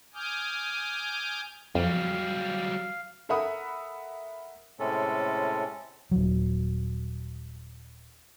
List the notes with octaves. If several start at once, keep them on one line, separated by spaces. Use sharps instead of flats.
G#5 D6 D#6 F6 G6
F2 F#3 G3 F5
A4 A#4 E5 F#5 B5 D#6
A2 C3 G#3 C#4 A4
D#1 F#3